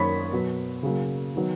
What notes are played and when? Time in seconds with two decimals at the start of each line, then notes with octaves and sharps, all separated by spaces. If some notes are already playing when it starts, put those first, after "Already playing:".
Already playing: F#2 D#3 A#3 C#5 B5 C#6 B6
0.33 B2 F#3 B3
0.83 C#3 F#3 A#3
1.36 D#3 F#3 B3